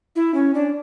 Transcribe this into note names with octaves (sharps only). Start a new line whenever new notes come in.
E4
C#4
D4